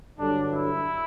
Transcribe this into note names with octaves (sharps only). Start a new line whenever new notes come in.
G2 D3 F#3 D4
E4